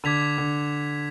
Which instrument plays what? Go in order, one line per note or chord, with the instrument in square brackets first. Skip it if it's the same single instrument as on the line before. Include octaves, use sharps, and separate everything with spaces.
[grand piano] D3 [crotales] D6 G#6 B6 F7
[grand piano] D3